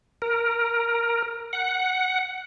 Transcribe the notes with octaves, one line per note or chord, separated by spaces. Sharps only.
A#4
F#5